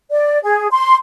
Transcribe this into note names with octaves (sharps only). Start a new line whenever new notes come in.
D5
G#4
C6